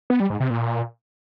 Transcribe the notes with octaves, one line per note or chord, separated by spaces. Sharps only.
B3
G3
G#2
C3
A#2